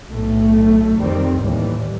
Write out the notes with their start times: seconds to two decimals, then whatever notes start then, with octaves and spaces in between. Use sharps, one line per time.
0.10 B1 A2 A3
0.99 F2 D#3 G3 C4
1.42 D#2 A2 E3 G3